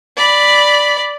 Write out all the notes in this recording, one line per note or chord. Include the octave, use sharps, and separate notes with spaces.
D5 B5